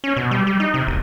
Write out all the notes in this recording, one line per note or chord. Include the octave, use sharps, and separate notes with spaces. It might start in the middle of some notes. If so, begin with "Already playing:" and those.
C#4
B2
G3
G3
D#4
C3
E1